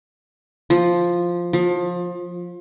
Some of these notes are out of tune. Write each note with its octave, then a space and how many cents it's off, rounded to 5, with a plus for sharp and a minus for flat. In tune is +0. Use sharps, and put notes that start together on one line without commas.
F3 +0
F3 +25